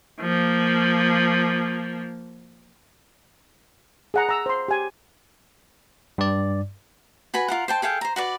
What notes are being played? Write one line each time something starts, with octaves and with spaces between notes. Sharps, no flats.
F3 A#3
G#4 F#5 A#5
A#5 E6
C5 C6
G4 G#5
G2 D5
F#4 B4 G#5 B5
F4 A#4 F#5
C5 G5 A5
G#4 A4 F5 G5
C5 A#5
F#4 B4 D5